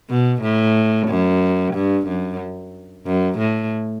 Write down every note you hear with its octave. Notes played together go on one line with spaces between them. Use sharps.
B2
A2
F#2
G2
F#2
F#2
A2